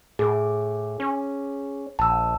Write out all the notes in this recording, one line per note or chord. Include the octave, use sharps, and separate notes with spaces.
A2 G#4
C#4
A#1 A5 E6